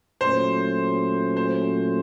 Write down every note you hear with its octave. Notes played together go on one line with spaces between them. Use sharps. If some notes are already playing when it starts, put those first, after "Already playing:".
A#2 F#3 A3 C#4 C5
C5